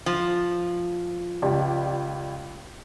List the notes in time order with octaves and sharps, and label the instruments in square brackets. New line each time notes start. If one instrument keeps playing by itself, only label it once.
[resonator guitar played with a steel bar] F3
[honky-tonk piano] C#2 G4 D5